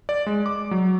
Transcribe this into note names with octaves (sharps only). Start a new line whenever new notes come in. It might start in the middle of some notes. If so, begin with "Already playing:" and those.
D5
G#3
D6
F#3